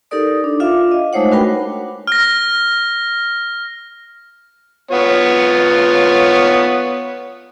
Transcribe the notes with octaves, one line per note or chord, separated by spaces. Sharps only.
D#4 G4 A4 A#4 D5 D#6
D4
F4 E5 F5 D6
D#5
G#3 A3 D#4 C5 C#5 F#5
D4 F#4 A#4 B4 G5 B5
F6 A#6
B3 F4 C#5